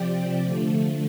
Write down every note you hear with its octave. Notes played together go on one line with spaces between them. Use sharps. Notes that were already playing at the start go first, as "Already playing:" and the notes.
Already playing: C3 F3 C4 G4 D5
D3 F3 A3